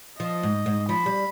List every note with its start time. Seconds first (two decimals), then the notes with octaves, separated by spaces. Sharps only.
0.20 F3 D#5
0.43 G#2
0.66 G#2
0.89 F3 B5
1.06 G3